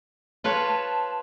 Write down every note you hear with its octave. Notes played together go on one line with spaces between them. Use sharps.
F4 B4 C#5 A5